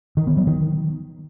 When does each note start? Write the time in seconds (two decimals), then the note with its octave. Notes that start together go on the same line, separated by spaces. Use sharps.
0.17 D#3
0.27 B3
0.37 F#3
0.47 D#3